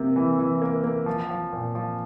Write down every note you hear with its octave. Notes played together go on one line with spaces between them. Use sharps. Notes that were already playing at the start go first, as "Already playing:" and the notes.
Already playing: C3 A#3
E3
E3
A#3
A#3
F3
F3
A#2
F3